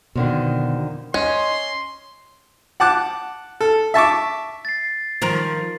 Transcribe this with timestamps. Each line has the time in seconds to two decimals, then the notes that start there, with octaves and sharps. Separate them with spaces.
0.15 F2 B2 D3 D#3
1.14 C#4 D#5 C6
2.80 F#5 A5 D6 F#6
3.60 A4
3.94 E5 A5 C#6 D6
4.65 A6 C7
5.22 D#3 F3 A#4